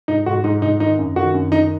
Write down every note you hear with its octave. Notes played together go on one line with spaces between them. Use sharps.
G#2 D#4
G#2 F#4
G#2 D#4
G#2 D#4
D#3 D#4
F#2
D#3 F#4
F#2
D#3 D#4